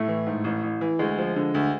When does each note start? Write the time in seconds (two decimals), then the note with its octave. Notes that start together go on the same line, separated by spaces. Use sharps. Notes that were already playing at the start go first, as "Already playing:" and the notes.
Already playing: A2 A3
0.08 E3
0.27 G#2
0.44 A1
0.63 A1
0.81 E3
0.99 D2 G#3
1.18 F3
1.36 D3
1.54 D2